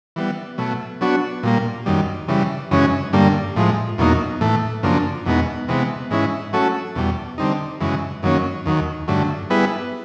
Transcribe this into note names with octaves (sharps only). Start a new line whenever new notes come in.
E3 G3 B3
B2 F#3 A3
F#3 B3 D4 F#4
A#2 G3 A#3
F#2 D#3 G3
C#3 E3 G3
F#2 C#3 E3 G#3 C#4
G2 D3 G3 A#3
A2 F3 G#3
E2 B2 F#3 A#3 D#4
A2 E3 A3
F#2 C#3 F3 A#3 D4
E2 B2 G#3 B3 D#4
C3 E3 G#3 B3
G#2 E3 G#3 C#4 E4
F#3 A3 C#4 F#4 A4
E2 B2 G3
D3 G3 C4 D#4
F#2 C#3 E3 G#3
F#2 D#3 F#3 A#3 C#4
D#2 D#3 F#3
G2 D3 F#3 A3
G3 B3 E4 G#4 B4